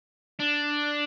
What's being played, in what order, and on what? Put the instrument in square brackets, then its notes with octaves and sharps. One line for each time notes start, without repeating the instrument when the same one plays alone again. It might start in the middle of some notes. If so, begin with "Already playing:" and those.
[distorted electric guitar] D4